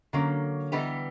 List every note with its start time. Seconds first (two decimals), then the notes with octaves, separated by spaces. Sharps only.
0.13 D3 F#3 A#3 C#4
0.72 E3 G3 B3 D#4 G4